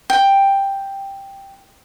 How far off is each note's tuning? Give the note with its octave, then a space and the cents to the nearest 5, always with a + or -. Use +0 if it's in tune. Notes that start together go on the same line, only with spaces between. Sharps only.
G5 +5